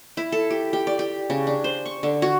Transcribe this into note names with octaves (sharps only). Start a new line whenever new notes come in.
E4
A4
G4
G4
D5
G4
C#3
D4
C5
C#6
D3
F#4